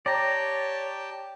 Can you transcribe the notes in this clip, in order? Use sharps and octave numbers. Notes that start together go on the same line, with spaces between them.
G4 C#5 D5 G5 A5 A#5